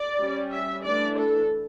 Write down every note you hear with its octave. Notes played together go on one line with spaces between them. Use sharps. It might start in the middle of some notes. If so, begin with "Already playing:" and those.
Already playing: D5
G3 C#4
E5
E3 A3 D4 D5
A4